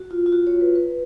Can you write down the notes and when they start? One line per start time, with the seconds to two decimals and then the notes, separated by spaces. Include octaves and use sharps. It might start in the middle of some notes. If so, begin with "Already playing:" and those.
Already playing: F#4
0.11 F4
0.26 F4
0.32 F#4
0.47 C#5
0.61 B4
0.75 B4